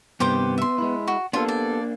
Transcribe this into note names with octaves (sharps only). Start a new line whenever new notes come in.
G2 C3 D#3 B3 G4 C5 D6
E5 C6
G#3 E4
F#4
A#3 B3 D4 F4 G4 A4 F5
D5